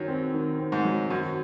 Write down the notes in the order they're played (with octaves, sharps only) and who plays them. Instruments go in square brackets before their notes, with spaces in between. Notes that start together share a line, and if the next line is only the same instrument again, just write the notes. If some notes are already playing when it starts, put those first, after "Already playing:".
Already playing: [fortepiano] F#2 [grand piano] D#3 F#3
[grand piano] C4
D#3
C4
[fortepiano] G#2
[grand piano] F#3
[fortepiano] F#2 [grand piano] D#3